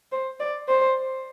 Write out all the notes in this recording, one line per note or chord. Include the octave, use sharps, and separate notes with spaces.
C5
D5
C5